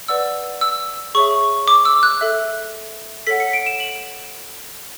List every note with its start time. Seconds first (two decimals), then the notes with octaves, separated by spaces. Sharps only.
0.08 B4 D5 F#5 E6
0.61 E6
1.15 G#4 C#5 E5 C#6
1.68 D6
1.85 E6
2.03 F#6
2.21 A4 E5
3.27 A4 C#5 F#5 B6
3.40 C#7
3.53 D7
3.66 E7
3.80 F#7